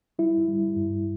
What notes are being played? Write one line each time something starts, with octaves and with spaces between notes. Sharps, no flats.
G3 E4
G3
G2